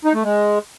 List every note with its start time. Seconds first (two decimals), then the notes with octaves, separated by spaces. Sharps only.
0.05 D#4
0.14 A3
0.23 G#3